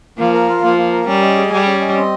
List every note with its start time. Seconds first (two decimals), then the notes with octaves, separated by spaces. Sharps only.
0.18 F3 A#3
0.34 A#4
0.49 F4
0.63 F3 A#3
0.78 A#3
0.93 A#4
1.07 G3 C#4
1.22 D#5
1.37 G#4
1.52 G3 G#5
1.66 C#4
1.81 D#5
1.96 C4